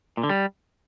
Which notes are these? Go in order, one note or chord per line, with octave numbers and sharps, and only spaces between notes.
A#2
D3
G3